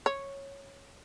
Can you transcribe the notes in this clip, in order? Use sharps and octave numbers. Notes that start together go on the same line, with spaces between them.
C#5